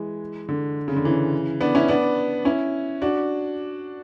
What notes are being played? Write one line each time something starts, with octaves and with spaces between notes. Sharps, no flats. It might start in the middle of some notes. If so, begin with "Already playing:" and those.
Already playing: E3 G#3
D3
C#3
D3
C#3 E3
B3 D4
C#4 E4
B3 D4
C#4 E4
D4 F#4